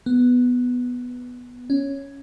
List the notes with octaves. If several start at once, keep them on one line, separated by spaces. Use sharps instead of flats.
B3
C#4